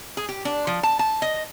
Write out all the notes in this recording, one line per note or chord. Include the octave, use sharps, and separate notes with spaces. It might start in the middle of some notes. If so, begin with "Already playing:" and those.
G#4
G4
D4
F3
A5
A5
D#5